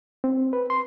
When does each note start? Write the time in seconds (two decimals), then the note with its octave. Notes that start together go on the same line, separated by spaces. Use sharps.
0.24 C4
0.53 B4
0.70 C6